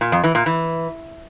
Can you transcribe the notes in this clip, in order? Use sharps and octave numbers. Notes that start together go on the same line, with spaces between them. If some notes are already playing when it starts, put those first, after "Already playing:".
A#2
F2
E3
A#2
E3